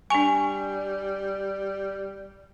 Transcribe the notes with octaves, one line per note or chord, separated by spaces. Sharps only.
G3 D4 G#5 C#6 F7